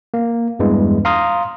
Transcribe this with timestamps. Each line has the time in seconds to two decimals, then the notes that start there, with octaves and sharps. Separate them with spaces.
0.14 A#3
0.59 E2 G2 E3 G#3
1.05 F5 A#5 C6 D#6 F6